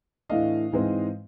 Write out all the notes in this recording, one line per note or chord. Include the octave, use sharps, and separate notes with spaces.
A2 E3 A3 D4 D#5 F5
G#2 E3 G#3 C4